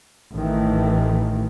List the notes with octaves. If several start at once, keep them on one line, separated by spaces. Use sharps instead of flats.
A1 D#3 E3 A3